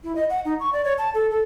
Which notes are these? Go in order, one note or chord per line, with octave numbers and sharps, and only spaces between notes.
E4
D#5
F#5
D#4
C#6
D5
C#5
A5
A4
A4